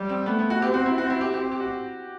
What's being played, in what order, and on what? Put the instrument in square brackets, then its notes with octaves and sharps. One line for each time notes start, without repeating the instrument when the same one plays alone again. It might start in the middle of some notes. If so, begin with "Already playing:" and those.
Already playing: [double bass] G3
[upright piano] C4
[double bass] A3 [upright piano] B3
[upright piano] B3
F#4
[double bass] C4 [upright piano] G4
[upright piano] F#4
E4
[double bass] C4 [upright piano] F#4
[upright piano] E4
G4
[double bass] C4 [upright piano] G4
[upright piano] G4
F#4